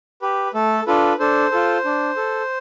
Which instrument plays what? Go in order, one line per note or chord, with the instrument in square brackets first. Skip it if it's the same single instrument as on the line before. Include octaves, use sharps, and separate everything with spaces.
[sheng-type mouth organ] G4 B4
A3 A4
D4 F4 A4 B4
D4 A4 C5
F4 A4
D4
A4